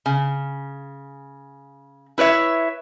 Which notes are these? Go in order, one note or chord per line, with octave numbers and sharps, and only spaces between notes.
C#3
E4 B4 C#5 E5